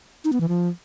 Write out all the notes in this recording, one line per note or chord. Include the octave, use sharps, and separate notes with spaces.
D#4
B3
E3
F3